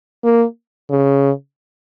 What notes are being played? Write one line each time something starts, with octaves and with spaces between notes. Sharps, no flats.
A#3
C#3